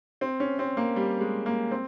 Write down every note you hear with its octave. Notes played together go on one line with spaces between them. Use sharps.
C4
C#4
C4
A#3
G3
G#3
A#3
C4